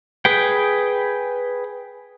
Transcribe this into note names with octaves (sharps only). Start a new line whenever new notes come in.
G#4 B4 G5